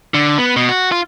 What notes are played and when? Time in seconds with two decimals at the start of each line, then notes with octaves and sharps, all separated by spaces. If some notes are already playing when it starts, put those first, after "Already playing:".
0.14 D3
0.38 B3
0.56 B2
0.69 F#4
0.92 F4